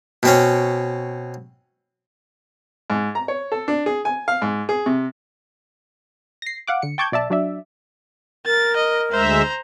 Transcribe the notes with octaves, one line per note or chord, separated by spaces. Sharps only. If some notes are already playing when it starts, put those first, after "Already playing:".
B2 C4 C#4
G#2
A#5
C#5
A4
D4
G#4
G#5
F5
G#2
G#4
C3
A#6 C7
F5 F#5 D6
D3 C#7
G5 A5 C#6 D6 G6 G#6
B1 D5 E5 A5
F#3 D4 D5 E5
A#4 A6
D#5
D2 G#3 C5 E5 A#5